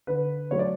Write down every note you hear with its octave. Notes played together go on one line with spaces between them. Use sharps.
D3 B4
F#3 A3 D4 C#5
D5